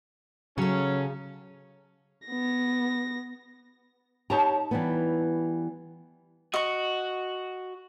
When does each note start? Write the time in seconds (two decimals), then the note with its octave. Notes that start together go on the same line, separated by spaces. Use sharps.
0.58 C#3 F#3 C#4 A4
2.27 B3 A#6
4.30 D#4 G4 C#5 A5 A#5
4.71 E3 G3 B3
6.54 F#4 D#5 C#6